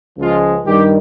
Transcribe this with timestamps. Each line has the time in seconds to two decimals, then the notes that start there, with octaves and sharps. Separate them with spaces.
0.18 C#2 C#3 F3 G#3 F4
0.66 G2 D#3 G3 G4